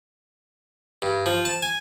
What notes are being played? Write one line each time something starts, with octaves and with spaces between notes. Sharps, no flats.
G2
F3
A5
G#5